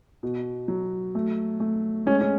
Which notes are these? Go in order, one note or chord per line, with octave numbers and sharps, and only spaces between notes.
B2
F#3
A3
A3
G#3 C#4
C#4